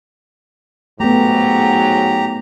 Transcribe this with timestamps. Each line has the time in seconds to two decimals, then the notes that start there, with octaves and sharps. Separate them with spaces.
1.00 G#2 F#3 A3 B3 G4 A#5